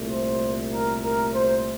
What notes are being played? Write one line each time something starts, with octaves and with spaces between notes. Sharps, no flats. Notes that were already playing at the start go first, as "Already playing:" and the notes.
Already playing: C2 A#2 A3
C5
A#4
A#4
C5